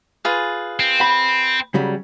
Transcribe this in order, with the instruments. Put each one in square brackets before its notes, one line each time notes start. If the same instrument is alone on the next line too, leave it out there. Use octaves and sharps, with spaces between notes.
[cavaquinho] F4 G#4 B4
[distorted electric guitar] C4
[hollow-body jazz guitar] B5
C#3 F#3 G3